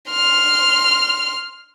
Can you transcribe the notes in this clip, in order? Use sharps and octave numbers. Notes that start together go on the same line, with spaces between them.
C6 F6